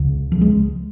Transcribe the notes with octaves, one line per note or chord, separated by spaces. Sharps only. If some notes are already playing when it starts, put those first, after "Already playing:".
Already playing: C#2 C#3
F3
G#3